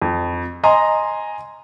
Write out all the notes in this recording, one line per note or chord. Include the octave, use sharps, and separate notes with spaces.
F2
D#5 G#5 A#5 C6